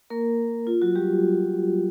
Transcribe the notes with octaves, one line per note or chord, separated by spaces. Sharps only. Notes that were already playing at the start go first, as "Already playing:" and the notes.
A#3 A#4
F4
F#3 F#4
G3 G4